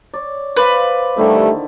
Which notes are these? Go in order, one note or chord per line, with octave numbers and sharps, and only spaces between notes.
C#5 D5
B4 C5 D5 F5
D3 D#3 G3 A3 E4